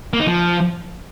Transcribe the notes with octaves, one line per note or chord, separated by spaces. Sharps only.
A#3
D#4
F3